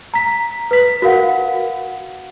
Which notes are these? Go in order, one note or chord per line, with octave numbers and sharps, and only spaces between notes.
A#5 B6
B4 B6
F#4 A#4 F5 F#5